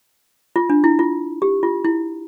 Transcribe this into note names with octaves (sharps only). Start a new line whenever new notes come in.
F4
D4
E4
F4
G4
F4
E4